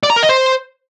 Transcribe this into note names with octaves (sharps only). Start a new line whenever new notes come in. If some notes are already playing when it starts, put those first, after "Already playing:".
D5
A#5
A#4
D#5
C5